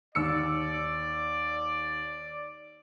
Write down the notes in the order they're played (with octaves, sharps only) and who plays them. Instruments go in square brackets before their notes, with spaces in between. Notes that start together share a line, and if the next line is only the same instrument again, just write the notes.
[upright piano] D#2 E6 C#7 [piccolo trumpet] D5